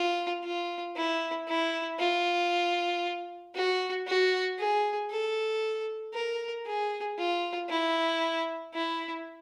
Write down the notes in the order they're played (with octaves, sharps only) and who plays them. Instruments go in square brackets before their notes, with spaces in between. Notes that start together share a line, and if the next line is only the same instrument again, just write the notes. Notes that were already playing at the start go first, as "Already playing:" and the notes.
Already playing: [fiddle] F4
F4
E4
E4
F4
F#4
F#4
G#4
A4
A#4
G#4
F4
E4
E4